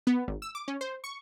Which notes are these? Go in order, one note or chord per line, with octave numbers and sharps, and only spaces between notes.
B3
G#1
E6
D6
C#4
C5
C#6